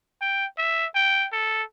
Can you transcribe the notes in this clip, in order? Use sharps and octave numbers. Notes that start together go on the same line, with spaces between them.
G5
E5
G5
A4